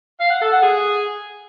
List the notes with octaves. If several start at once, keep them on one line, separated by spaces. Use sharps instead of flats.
F5
F#5
A4
F#5
G#4